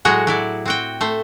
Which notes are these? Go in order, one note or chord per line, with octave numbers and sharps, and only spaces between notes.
A2 F#3 G#3 F#4 G#4
F#3 E4 D5
C4 F#4 G5
A3 C5